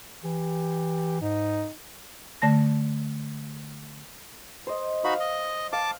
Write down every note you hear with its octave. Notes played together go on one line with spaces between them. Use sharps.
E3 G4
G#2 D#4
D3 A3 A5 A#6
C5 D#5
D#4 F#4 F5 B5
D#5
F5 A5 D6